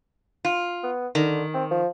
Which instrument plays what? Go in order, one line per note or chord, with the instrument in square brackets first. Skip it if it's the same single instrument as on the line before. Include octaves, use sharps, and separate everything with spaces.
[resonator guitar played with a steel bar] F4
[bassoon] B3
[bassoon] D3 [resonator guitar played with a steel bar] D#3
[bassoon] C4
F3